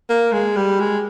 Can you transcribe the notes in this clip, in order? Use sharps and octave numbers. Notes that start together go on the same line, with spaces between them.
A#3
G#3
G3
G#3